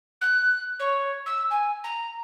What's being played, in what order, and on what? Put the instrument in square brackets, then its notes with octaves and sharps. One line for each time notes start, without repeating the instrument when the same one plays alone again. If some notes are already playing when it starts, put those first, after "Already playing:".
[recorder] F#6
C#5
E6
G#5
A#5